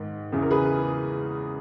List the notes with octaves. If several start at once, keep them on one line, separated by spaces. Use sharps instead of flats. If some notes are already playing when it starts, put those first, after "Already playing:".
Already playing: G#2 D#3
E2 C#3 E3
A#4
G#4 B4